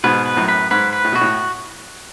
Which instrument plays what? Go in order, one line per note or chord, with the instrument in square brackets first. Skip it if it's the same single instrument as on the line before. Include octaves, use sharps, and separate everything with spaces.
[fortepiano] G#2 B2 [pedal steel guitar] B4
[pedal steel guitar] B4
[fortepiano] F#2 A2
[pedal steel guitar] B4
[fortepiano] G#2 [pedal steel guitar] B4
[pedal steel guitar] B4
[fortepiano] A2
[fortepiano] B2 [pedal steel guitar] F#4
[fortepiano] A2